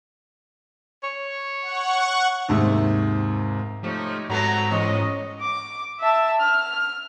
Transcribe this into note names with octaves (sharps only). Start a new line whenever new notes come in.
C#5
F#5 C#6
D#2 G#2 C3
F3 A3 D#4 G4 C#5
G#2 F#3 A3 B3 C4 F#4 A#5
E2 C#4 C#5 D#5 C#6
D6
E5 A5
F6